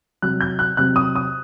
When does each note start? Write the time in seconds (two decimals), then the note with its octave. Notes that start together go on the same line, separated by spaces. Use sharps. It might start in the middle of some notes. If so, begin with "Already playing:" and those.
0.22 C3 F#3 F#6
0.41 G6
0.59 F#6
0.77 C3 F#3 F#6
0.96 D#6
1.16 D#6